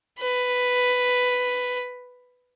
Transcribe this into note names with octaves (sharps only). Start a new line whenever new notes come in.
B4